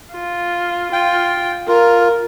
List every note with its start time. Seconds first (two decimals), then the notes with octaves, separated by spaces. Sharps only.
0.13 F4
0.92 F4 G5
1.68 F4 A#4